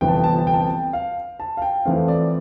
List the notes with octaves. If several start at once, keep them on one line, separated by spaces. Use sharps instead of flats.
G1 F2 C3 E3 B3 G5
A5
G5
A5
G5
A5
G5
A5
G5
F5
A5
F5
G5
F2 E3 A3 C4 F5
D5